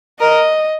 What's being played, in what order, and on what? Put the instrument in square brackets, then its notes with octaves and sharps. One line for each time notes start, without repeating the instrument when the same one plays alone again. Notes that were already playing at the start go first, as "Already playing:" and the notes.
[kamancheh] A#4 [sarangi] D#5